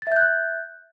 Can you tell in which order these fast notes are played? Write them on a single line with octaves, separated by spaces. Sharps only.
A6 E5 G6 F#6